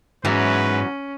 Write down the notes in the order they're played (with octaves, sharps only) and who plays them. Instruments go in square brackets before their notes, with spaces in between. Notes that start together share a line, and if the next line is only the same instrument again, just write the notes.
[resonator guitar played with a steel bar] E2 F#3 [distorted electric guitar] G#2 [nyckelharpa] C#4 [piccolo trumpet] B4